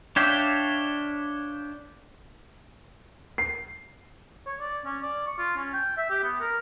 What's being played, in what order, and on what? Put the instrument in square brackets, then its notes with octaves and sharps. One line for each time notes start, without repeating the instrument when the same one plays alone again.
[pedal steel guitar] D4 C#5 E5 F5 G5
[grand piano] C7
[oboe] C#5
D5
C#4
D5
C#6
F4
C#4
G5
E5
G4
B3
A#4